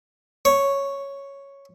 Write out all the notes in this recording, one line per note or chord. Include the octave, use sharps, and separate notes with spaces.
C#5